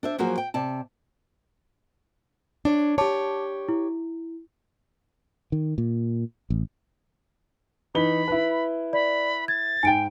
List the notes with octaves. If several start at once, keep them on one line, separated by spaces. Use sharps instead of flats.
D4 C5 E5
F3 F#3 A#3 F#4 G#4 C5
G5
C3 D5 A5
D4 C#5
G4 C#5 A5 D6
E4
D#3
A#2
A1
E3 D#4 B5 G7
E4 B4
D5 B5
G#6 A6
G#2 G5 G#5 D7